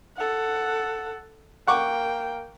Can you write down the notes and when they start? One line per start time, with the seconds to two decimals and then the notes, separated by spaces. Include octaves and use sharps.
0.17 A4 F#5
1.67 A#3 F#5 G5 C#6 D6